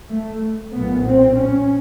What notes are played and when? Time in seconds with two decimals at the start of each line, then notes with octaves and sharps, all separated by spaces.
0.10 A3
0.73 B1 A#2 B3
1.05 C4
1.36 C#4